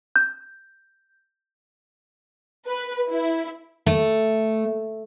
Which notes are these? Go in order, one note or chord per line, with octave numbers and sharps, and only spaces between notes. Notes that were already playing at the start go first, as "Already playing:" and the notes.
G6
B4
E4
A3